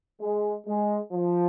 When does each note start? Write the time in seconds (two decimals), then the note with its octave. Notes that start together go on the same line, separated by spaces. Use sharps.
0.21 G#3
0.67 G#3
1.13 F3